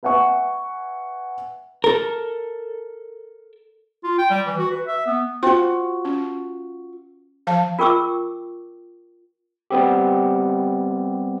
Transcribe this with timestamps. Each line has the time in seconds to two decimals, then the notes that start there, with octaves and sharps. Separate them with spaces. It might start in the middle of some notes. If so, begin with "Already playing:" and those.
0.03 B4 E5 F#5 G#5 C#6
1.84 A4 A#4
4.04 F4
4.18 G5
4.30 G3
4.47 E3
4.58 F#4
4.71 B4
4.87 E5
5.06 B3
5.43 F4 F#4 C5 G5
6.05 C#4
7.47 F3 F5 A5
7.79 F4 A#4 G5 C#6 D6 E6
9.71 G3 B3 C4 G4